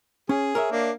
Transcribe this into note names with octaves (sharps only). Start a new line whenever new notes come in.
C#4 G#4
A#4 C#5 E5
A#3 D4